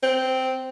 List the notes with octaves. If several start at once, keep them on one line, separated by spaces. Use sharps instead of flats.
C4